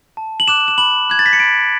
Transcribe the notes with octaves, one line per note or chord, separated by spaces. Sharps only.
A5
F#7
D6 F#6 E7
E7
B5 F#7
F#6 G#6
A6
B6
C#7
B5 D7